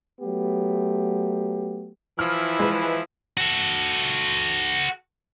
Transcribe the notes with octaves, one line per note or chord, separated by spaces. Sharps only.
F#3 A3 B3 G4
E3 F3 E4 F6
G#3 B4
F#4 A4